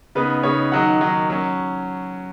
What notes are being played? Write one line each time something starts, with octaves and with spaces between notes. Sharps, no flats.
C#3 B3 D#4 B4
C#3 B3 D#4 C#5
D#3 F#3 D#4 F#5
D#3 F#3 D#4
F#3 C#4